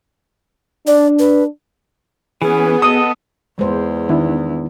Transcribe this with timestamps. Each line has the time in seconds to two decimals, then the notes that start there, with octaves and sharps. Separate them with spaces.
0.87 D4 D5
1.19 B4
2.42 E3 B3 C#4 G#4
2.82 A4 D#5 D#6
3.59 E2 G#3 C5
4.09 D#3 B3 D4 E4